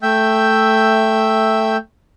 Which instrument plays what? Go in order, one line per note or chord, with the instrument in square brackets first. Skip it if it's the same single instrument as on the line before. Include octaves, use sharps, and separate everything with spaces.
[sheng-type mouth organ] A3 E5 G5 E6 G6